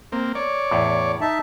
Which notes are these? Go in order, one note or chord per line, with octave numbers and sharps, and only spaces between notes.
A#3 C4
C#5 D5
E2 A2
D#4 E5 A5